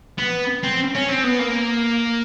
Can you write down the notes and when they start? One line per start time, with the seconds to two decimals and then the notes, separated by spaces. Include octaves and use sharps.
0.18 B3
0.64 C4
0.95 C#4
1.09 C4
1.24 B3
1.39 A#3